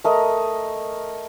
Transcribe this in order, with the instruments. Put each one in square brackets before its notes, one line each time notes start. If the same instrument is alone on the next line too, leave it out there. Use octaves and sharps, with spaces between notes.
[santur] A3 A#4 D#5